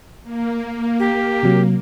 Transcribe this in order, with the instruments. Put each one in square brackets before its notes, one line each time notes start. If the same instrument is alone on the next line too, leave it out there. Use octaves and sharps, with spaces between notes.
[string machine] A#3
[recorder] G4
[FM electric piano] C3 F#3